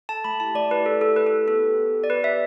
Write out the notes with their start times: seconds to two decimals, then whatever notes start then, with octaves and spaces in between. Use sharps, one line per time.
0.09 A4 A5
0.24 A3 B5
0.40 E4 G4 A5
0.55 A3 D5
0.71 E4 G4 B4
0.85 A3 A4
1.01 E4 G4 A4
1.16 A3 B4
1.27 A4
1.32 E4 G4
1.48 B3 A4
1.64 G4
1.79 B3
1.94 G4
2.04 D5
2.10 B3 B4
2.24 G4 E5